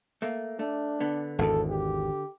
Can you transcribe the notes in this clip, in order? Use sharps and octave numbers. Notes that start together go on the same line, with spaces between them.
A3 A#3
A3 D4
D3 B3
G#1 E2 A4
G4